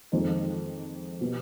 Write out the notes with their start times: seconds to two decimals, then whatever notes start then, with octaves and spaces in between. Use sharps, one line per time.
0.12 F2 D#3 G#3 C4 D#4
1.21 B2 G3 B3